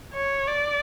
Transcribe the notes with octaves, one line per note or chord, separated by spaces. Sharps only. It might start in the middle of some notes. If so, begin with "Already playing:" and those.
C#5
D5